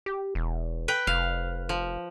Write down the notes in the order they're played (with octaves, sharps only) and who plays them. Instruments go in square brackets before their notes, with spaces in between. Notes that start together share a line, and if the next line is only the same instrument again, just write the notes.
[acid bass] G4
E1
[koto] B4 G5
[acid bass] F1 [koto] F5
[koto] F3